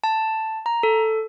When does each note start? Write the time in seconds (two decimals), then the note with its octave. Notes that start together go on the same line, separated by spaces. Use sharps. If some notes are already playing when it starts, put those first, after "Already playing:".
0.04 A5
0.66 A#5
0.83 A4